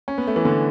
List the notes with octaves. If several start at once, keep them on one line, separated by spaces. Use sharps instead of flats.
C#4
B3
A3
E3
D3